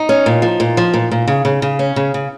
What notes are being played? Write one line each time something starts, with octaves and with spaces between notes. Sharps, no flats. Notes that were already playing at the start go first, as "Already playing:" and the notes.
Already playing: D#4
C#4
A#2
F3
A#2
F3
A#2
A#2
C#3
C#3
C#3
C#4
C#3
C#3